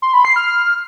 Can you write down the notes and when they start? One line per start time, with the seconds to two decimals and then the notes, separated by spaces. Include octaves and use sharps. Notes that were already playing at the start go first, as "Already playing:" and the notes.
0.02 C6
0.13 B5
0.25 C7
0.36 F6